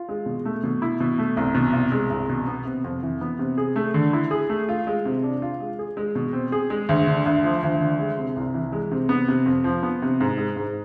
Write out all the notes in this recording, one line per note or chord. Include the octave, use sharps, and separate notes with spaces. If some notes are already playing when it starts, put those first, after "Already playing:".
Already playing: F4
G#3
B2
A3
B2
E4
B2
A3
C2
B2
C2
G#3
C2
B2
B3
C3
F2
E3
B3
C3
G#4
A3
D3
E4
G#4
A3
F4
G#3
C3
D4
F4
G#3
G#4
G#3
B2
C4
G#4
G#3
D2
D3
D2
F3
D2
D3
G#3
C3
C2
E3
G#3
C3
B3
C3
F2
F3
B3
C3
G#2
G#3
G#2